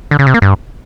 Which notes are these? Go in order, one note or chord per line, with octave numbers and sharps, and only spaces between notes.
D3
C#3
C3
A#3
G2